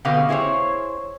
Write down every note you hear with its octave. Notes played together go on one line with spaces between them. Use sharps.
B2 D3 B3 G4 B4 F5
E4 G#4 C5 C#5